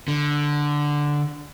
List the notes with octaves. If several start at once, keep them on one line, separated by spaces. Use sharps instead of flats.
D3